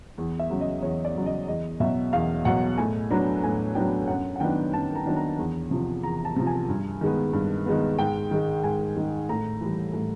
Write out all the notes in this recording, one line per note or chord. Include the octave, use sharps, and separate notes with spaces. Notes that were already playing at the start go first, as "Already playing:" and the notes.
E2
E5
C#3 F#3
D#5
E2 C#5
D5
C#3 F#3
D#5
E2 D#5
B2 F#3 E5
E2 F5
B2 F#3 F#5
A2 G#5
F#3 B3 D4 A#5
A2 G#5
F#3 B3 D4 G5
F#2 F#5
F#5
D#3 F#3 B3 D4 G5
F#2 A5
A#5
D#3 F#3 B3 D4
A#5
E2
C3 F3
E2 A#5
A5
C3 F3
G#5
G2
D#3 G#3 B3
G2
D#3 G#3 B3
G#2 G5
D#3 G#3
G#2 G#5
D#3 G#3
A2 A#5
E3 G3
A2